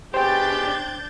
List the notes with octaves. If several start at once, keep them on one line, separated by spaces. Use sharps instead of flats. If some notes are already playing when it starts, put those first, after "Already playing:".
B2 D4 G4 G#4 C5 G5 G6 A6